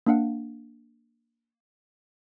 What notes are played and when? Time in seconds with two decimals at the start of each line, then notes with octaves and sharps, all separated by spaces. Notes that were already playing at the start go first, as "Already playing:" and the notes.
0.07 A#3 D4 F5 F#5